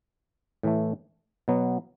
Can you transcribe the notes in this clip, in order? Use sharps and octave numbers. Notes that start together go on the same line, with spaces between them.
A2 E3 A3
B2 F#3 B3